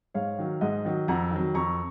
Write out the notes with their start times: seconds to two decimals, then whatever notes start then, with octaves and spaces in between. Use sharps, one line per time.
0.14 G#2 C#5 F5
0.38 D#3 F#3
0.61 G#2 D#5 F#5
0.85 D#3 F#3
1.08 F2 F#5 A#5
1.31 D#3 F#3
1.54 F2 A#5 C#6